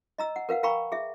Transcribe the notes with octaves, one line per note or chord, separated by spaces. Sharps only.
D#5 A#5 E6
F#5
A#4 B4 F5 F#5
A#4 F5 G5 A#5 B5 C#6
G#4 E5